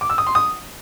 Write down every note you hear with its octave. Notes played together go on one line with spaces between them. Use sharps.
D6
E6
D#6
C6
D#6